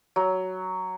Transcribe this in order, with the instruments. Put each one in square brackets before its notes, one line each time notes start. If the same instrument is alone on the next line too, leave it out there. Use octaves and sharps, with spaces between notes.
[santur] F#3